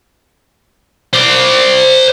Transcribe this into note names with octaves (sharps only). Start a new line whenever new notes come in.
C5 D5